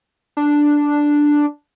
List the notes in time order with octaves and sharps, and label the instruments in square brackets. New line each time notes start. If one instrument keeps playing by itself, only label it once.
[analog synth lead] D4